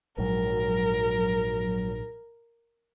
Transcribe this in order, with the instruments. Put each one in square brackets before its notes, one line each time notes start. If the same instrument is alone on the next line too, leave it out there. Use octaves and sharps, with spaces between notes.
[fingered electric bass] A#1 G#2 [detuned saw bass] F#3 [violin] A#4